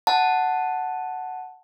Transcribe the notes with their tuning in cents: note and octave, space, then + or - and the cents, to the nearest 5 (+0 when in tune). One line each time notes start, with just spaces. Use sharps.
F#5 +0 A5 +0